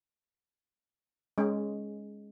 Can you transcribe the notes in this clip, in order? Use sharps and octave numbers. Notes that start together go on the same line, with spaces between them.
G#3 C#4